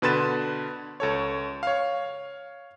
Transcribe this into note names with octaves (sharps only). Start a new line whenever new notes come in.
B2 D3 B4 C6 A6 E7
C#2 A4 C#5
C#5 F5